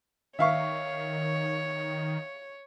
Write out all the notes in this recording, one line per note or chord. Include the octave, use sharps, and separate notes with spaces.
D#3 C#5 E5 F5 C#6